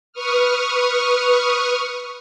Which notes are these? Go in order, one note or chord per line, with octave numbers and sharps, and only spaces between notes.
B4 C#6 D#6 F6